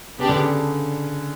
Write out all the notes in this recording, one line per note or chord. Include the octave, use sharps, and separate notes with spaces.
C#3 B3 D4 G4 D5
D3
C#3